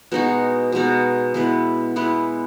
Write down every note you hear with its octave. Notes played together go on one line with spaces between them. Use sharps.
B2 G#3 D#4 F#4
B2 G#3 D#4 F#4
G#3 B3 E4 B4
G#3 B3 E4 B4